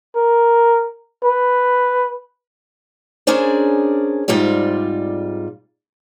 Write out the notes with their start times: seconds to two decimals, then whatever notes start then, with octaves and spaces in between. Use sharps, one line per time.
0.16 A#4
1.24 B4
3.27 C#4 D4 G#4 A#4 C5 D5
4.28 G#2 G3 C4 F4 D5